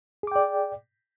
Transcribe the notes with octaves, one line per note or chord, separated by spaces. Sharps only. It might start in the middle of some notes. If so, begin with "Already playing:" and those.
G#4 D5 G5 D6